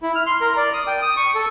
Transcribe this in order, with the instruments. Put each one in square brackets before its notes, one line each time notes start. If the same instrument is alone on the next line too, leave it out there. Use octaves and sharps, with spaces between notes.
[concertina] E4
F6
C6
A#4
D5
D#6
G5
D#6
C#6
A4